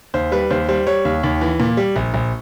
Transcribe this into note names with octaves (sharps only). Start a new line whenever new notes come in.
D#2 C5
G3 B4
D#2 C5
G3 C5
G3 C#5
D#2
D#2
E3
A#2
G3
A#1
A#1